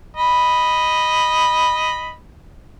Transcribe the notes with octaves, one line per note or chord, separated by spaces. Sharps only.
D#5 B5